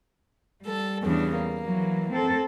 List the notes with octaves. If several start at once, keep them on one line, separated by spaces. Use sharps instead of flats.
G3 A4
E2 C#3 D4
A#3
E3 F#3
C4 A4